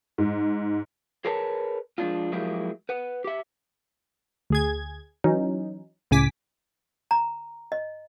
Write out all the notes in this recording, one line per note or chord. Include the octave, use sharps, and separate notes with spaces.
G#2
G#4 A#4 B4 C#5 A5
F3 G#3 A#3 D4 D#4 F4
F3 F#3 G#3 A#3 E4 G4
B4 F#5
G4 E5
D2 G#4 G#6
E3 F#3 C#4 D#4
C#2 A2 C#3 G#5 D6 B6
A#5
D#5